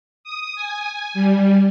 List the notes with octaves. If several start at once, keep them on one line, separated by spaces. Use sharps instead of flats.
D#6
G#5
G3